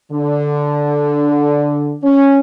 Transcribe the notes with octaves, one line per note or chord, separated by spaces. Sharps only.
D3
C#4